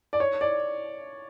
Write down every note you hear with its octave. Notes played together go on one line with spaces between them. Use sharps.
D5
C#5
D5